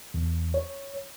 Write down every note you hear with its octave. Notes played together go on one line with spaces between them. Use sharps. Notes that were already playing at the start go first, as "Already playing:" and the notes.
E2
C#5